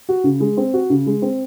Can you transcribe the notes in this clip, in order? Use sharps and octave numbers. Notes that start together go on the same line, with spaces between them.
F#4
C#3
G#3
C4
F#4
C#3
G#3
C4